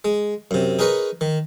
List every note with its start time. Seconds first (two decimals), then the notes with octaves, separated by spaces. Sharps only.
0.05 G#3
0.51 F#2 C3
0.79 D#4 G#4 A#4 B4 C#5
1.21 D#3